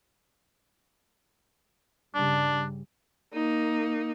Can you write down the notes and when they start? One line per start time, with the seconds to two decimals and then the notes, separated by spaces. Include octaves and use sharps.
2.15 G2 C#3 G3 D4
3.33 A#3 D#4